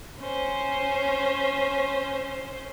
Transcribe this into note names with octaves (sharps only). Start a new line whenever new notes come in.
C#4 C5